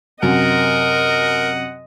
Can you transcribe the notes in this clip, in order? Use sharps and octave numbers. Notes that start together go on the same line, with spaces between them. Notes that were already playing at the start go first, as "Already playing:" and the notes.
F#2 C3 F#4 A#4 D#5 F#5